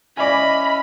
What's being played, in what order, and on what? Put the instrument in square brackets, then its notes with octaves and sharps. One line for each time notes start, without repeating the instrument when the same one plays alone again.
[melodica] C#4 E4 [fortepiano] D5 G#5 [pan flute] D#5 [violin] B5